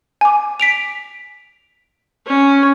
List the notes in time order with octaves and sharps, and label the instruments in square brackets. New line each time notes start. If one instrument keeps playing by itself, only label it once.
[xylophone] G#5 D6
B6 D7 F7
[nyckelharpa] C#4